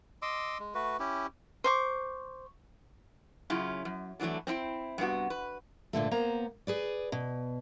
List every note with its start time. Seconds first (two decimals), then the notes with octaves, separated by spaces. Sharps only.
0.22 D#5 C6 D6 E6
0.59 G#3
0.75 A3 F#4 B4
0.99 C#4 E4 G4
1.64 C5 C#6 D6
3.50 F#2 C#3 C#4 E4 F4
3.85 F#2
4.20 D3 E3 F#3 A3 D4
4.47 C4 D4 E4 G5
4.98 G2 C3 B3 F#4
5.30 B4
5.93 G2 A#2 D3 A3
6.11 A#3 B3 C5 A#5
6.67 G#4 B4 D5
7.12 B2